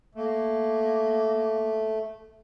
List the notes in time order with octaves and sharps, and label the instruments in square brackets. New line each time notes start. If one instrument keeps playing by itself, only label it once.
[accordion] A3 [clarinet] A#3